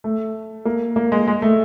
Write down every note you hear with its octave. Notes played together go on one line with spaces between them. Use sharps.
A3
A#3
A#3
G#3
G#3
A3